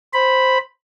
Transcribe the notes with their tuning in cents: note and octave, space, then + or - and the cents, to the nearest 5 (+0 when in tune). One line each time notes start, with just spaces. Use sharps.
C5 +0 B5 +0